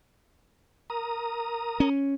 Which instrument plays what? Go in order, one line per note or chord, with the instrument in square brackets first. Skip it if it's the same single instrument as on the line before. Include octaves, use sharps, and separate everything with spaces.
[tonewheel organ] A#4 A#5 D#6
[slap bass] C#4